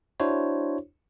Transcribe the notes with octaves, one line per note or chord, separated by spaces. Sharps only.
D4 E4 F#4 C5 C#5